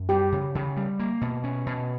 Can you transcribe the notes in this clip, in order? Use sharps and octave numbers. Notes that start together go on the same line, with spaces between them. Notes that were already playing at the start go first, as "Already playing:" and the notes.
Already playing: F#2
G3 G4
C#3
C#3
G3
A#3
B2
C#4
B2